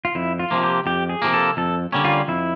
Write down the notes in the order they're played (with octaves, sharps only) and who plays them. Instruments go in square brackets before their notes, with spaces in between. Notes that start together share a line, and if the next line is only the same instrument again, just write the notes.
[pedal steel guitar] F4
[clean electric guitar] F2 [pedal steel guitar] E4
[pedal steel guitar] F4
[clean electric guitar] C3 F3 A#3
[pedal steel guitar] G4
[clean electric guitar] F2 [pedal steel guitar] G4
[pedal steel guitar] G#4
[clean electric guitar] C3 F3 A#3
[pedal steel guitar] A4
[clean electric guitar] F2 [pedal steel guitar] A4
[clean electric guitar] D3 G3 A#3 C#4
[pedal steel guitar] F4
[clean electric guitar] F2 [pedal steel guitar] E4